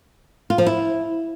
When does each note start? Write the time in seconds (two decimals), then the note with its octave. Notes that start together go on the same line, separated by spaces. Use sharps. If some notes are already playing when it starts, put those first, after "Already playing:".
0.50 F4
0.58 F3
0.66 E4